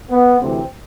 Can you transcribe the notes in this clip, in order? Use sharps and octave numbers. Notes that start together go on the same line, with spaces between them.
B3
D2 C3 E3 C4